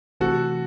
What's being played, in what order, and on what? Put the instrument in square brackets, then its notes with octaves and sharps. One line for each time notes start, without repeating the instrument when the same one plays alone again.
[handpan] C3 E3 A3 C4 E4 [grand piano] F#4 A4